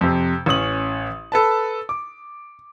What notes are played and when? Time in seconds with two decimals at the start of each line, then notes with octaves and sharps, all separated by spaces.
0.01 F2 C3
0.46 A1 C#4 D#6 F#7
1.32 A4 B4 A5
1.89 D6